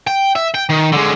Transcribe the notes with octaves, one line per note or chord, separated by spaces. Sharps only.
G5
E5
G5
D#3
D3 G#3